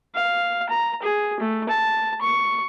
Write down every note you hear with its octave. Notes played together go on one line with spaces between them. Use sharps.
F5
A#5
G#4
A3
A5
C#6